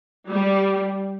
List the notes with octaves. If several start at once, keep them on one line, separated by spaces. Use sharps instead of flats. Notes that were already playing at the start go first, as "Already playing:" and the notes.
G3